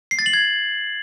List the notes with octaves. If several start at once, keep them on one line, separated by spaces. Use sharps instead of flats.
C7
A6
F#7
G#6